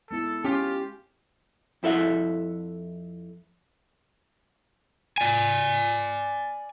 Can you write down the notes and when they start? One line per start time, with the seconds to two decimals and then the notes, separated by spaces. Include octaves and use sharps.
0.11 G#3 B3 E4 A4
0.44 C#4 F4 G4
1.83 F2 E4 A4 E5 F#5
5.18 D5 G#5